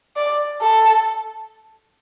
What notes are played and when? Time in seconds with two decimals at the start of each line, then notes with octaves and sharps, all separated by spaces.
0.16 D5
0.62 A4